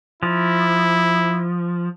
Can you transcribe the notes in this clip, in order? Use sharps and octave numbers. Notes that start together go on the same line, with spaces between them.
F3 E4